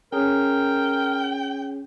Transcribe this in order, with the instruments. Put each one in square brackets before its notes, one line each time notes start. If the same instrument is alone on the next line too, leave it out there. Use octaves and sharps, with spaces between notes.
[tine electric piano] C#4 G#4 [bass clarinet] A#4 [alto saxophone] G5